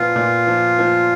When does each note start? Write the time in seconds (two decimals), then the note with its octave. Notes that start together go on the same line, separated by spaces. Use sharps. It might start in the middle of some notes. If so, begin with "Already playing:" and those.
Already playing: A#2 F3 B3 F4
0.16 A#2
0.47 F3
0.79 F3